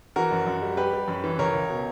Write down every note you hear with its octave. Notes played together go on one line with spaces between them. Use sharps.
E3 F#4 A#4
F#2
F#2
G3
G3 G4 B4
G3
F#2
E3
C#2 A#4 C#5
C#2
B2